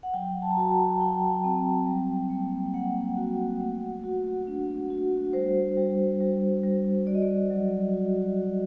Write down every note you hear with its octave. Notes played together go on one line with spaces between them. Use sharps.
F#5
F#3 G5
A5
A#5
F#4 A5
A5
F#3 G5
C4
G3
A#3
A#3 F#5
F#4
A3
F#4
D4
F#4
G3 C5
G3
G3
G3
F#4 D5
D#5
D5
F#3
F#4
F#4